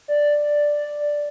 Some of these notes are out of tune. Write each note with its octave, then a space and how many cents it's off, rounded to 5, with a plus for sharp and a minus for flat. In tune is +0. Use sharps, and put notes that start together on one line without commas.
D5 +0